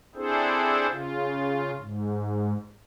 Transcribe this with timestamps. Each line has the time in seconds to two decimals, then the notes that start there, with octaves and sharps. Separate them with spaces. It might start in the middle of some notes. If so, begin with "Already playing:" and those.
0.15 C4 D4 E4 G#4 A4 C5
0.91 C#3 F4
1.79 G#2